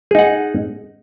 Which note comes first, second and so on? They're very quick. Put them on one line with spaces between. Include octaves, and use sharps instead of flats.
G#4 D#4 F#5